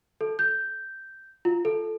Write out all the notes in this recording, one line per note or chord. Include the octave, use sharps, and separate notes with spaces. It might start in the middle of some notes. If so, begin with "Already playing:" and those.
A4
G6
F4
A4